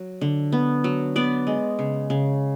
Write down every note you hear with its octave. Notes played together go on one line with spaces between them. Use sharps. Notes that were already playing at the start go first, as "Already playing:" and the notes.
Already playing: F#3
D3
B3
F#3
B3 D5
G#3
C#3
C#3